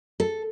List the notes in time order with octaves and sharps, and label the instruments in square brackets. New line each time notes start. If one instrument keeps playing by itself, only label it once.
[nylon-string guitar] A4